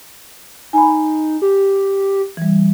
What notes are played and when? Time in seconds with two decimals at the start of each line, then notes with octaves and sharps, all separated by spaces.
0.73 D#4 G#5 B5
1.42 G4
2.37 E3 G3